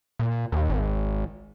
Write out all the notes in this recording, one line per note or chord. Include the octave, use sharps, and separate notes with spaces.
A#2
D#2
G#1